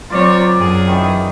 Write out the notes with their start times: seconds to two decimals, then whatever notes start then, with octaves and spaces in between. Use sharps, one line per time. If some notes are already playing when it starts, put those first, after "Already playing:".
0.10 F#3 C4 F4 A#4 C#5 D5
0.57 F#2 G#4
0.87 D#3 E3